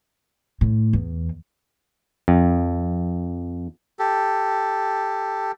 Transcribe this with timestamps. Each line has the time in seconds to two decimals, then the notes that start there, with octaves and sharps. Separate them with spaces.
0.61 A2
0.93 E2
2.28 F2
3.99 G4 A4